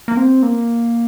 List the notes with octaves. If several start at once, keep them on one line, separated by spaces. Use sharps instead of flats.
A#3
C4
A#3